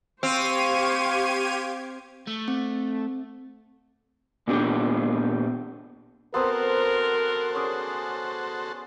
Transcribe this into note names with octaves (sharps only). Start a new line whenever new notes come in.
C4 G4 C5 F5 C#6 G#6 D#7
A3
C4
A#2 B3 C4 D4 G4
B3 C4 F#4 A4 A#4 C5 A#5
C#4 G#4 D5